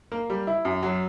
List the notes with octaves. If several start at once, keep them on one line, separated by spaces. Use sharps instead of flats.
A#3
G3
E4
F#2
F#3